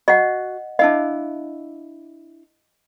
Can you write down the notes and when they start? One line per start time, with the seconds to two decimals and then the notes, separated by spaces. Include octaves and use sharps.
0.08 F#4 D#5 F#5
0.79 D4 E4 D#5 F5